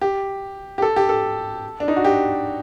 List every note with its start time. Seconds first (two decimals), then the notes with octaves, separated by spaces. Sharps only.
0.01 G4
0.78 G4
0.82 A4
0.96 G4
1.09 A4
1.80 D4
1.88 D#4
1.96 F#4
2.05 G4